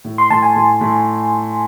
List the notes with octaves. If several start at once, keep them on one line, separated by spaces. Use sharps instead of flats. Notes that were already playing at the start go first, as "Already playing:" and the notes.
A2
C6
A2 A5
G#5
A2
A2